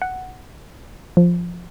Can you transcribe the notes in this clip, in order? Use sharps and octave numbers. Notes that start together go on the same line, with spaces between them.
F#5
F3